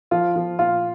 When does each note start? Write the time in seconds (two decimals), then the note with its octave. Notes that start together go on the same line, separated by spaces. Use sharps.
0.11 F3 F4
0.36 F3
0.59 A#2 F4